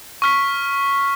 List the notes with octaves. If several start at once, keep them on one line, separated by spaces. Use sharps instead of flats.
C#6 F6 B6